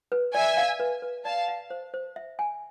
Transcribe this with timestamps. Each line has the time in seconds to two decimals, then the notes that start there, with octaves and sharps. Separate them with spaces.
0.12 B4
0.34 D5 E5 G#5
0.57 F5
0.80 B4
1.02 B4
1.25 D5 F5 A5
1.48 F5
1.70 C5
1.94 C5
2.16 E5
2.39 G#5